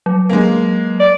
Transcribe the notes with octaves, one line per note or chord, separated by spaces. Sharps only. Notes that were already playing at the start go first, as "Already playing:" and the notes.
F#3
G#3 A#3
D5